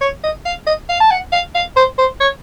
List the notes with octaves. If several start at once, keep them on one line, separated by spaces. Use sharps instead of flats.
C#5
D#5
F5
D#5
F5
A5
F#5
F5
F5
C5
C5
C#5